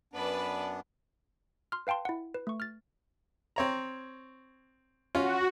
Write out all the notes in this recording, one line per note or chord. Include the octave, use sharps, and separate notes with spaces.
F#2 B3 D4 B4 D5 A5
C6 F6
B4 F5 G5 A5 C6
E4 F#5
B4
A3 C#6
F6 A6
C4 C#5 A#5
C#4 F4 F#4